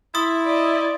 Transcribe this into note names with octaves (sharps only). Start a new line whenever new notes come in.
E4 C6 D#6 A6
D5 D#5